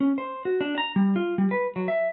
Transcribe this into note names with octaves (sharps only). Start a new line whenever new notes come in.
C#4
C5
F#4
D4
A#5
G3
F4
G3
B4
F#3
E5